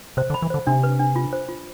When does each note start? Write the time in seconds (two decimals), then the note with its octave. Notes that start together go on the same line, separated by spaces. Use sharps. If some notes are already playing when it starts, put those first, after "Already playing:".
0.17 C3 C5
0.30 D3
0.34 B5
0.42 E3
0.50 D3 C5
0.67 C3 D4
0.83 B4
0.99 D4
1.16 F4
1.33 C5
1.49 F4